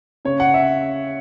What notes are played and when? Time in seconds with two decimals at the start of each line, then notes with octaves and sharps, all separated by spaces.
0.25 C#3 C#5
0.40 F#5
0.54 E5